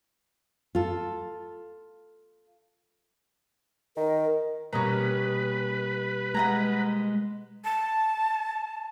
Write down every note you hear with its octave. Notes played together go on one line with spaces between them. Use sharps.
F4 A4
D#3 A#4
B2 G3 A#3 C#4 B4 D#5 A#5
G#3 D#5 F#5 A#5 F6 G#6
A5